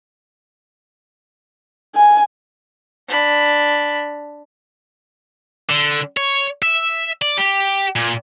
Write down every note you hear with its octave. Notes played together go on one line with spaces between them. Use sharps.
G#5
D4 B5
D3
C#5
E5
D5
G4
A#2